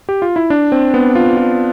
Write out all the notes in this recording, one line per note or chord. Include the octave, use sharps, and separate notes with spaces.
G4
F4
E4
D4
C4
B3
F4
F4